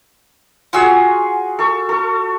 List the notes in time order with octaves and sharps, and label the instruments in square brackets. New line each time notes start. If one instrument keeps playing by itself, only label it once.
[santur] F4 F#4 G#4 [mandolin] F#5 G#5 E6
[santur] A4 C#6
A4 C#6